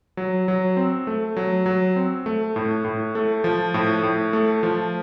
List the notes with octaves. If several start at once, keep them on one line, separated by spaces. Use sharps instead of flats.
F#3
F#3
C4
A3
F#3
F#3
C4
A3
A2
A2
A3
F3
A2
A2
A3
F3